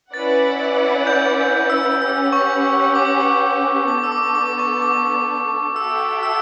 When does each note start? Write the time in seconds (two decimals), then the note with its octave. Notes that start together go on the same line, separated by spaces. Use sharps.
0.14 C#4 E4 B4 D5 F#5 A6
1.07 G6
1.70 E6
2.01 C#4 G4 B4 F#5 E6
2.33 C#6
2.95 D6
3.88 B3 D4 A4 D6
4.04 E6
4.12 D6
4.35 D6
4.59 C#6
4.82 D6
5.76 F#4 A4 E5 G5 E6
6.23 E6